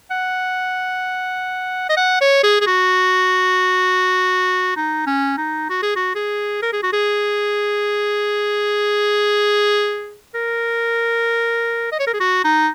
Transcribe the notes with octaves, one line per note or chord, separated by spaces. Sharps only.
F#5
D#5
F#5
C#5
G#4
G#4
F#4
D#4
C#4
D#4
F#4
G#4
F#4
G#4
A#4
G#4
F#4
G#4
A#4
D#5
C#5
A#4
G#4
F#4
D#4